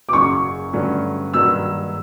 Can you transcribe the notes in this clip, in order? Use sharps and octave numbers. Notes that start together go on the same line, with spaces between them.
D6
F#1 F#2 C#3 F#3 C#6
G2 D3 F#3 A3 C#4
G2 D#3 F#3 A#3 E6